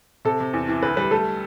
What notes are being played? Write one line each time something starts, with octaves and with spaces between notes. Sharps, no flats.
C3 A4
C3
E2
E3
D2 B4
G3 B4
A3 A4